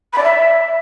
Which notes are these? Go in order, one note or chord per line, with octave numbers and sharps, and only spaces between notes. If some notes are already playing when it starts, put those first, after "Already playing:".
B5
D5
E5